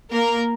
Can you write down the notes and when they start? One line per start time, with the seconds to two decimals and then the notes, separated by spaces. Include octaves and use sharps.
0.11 A#3 A#4